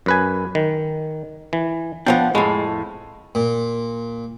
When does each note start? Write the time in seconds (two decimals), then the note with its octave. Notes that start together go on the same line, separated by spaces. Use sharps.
0.06 F#2 B4 G#5
0.55 D#3
1.53 E3
2.07 F3 B3 C#4 D4 G5
2.35 F2 A2 G#3
3.35 A#2